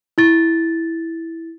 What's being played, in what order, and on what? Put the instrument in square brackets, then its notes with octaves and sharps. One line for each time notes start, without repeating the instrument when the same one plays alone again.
[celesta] E4 A6